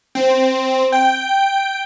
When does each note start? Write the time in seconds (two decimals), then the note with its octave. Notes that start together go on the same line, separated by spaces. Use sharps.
0.15 C4
0.92 G5
1.29 G5